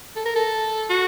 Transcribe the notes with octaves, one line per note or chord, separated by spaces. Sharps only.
A4
A#4
A4
F#4